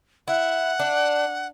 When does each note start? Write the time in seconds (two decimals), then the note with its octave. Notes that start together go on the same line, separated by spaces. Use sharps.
0.28 E4 F#5
0.79 D4